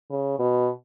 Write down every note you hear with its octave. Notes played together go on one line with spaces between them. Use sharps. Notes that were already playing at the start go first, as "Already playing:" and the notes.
C#3
B2